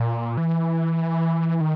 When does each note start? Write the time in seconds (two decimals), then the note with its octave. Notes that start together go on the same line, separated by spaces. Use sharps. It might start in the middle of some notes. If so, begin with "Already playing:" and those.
Already playing: A#2
0.37 E3
1.61 D#3